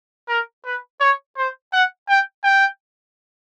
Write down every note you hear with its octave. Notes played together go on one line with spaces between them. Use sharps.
A#4
B4
C#5
C5
F#5
G5
G5